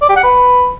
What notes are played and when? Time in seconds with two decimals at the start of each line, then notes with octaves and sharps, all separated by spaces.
0.02 D5
0.09 G4
0.16 F#5
0.24 B4